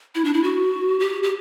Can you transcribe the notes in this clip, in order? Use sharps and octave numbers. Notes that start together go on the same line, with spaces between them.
E4
D4
E4
F#4
G4
G4